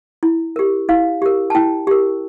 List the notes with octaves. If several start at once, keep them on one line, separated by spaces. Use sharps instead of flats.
E4
G4 A#4
E4 F5
G4 A#4
A5
E4 G5
G4 A#4